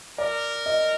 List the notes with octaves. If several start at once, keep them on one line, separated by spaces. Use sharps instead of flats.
A#4 D5
D#5